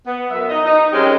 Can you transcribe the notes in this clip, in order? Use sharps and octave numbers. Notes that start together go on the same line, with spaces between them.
B3
F#2 E5
D#4 D#5
D#4
F#2 G#3 C4 C#4 G4